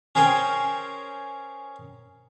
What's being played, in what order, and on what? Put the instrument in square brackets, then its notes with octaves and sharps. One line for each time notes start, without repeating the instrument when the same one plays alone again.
[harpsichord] C#4 G#4 A#4 C5 G5 G#5